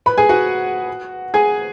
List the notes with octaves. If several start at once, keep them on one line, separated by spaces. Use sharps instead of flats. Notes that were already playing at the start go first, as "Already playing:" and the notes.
B4 B5
G#4 G#5
F#4 F#5
G#4 G#5